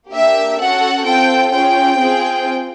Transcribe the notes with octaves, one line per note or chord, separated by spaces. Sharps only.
A#3 D4 G4 E5
C#4 F#4 A4 F#5
C4 F4 A4 G5
C#4 F4 G#4 G5
C4 F4 G#4